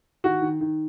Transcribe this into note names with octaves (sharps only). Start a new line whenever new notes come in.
D#3 F#4
D#3
D#3